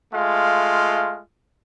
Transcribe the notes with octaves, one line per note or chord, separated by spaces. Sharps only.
G#3 A3 F4 F5